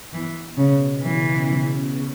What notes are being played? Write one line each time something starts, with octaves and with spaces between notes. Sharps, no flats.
E3 B3
B2
C#3
B2
C#3 E3
B2